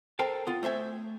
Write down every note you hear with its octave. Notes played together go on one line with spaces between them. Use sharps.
A4 A#4 C5 G5 A5
B3 F4
A3 C5 E5 G#5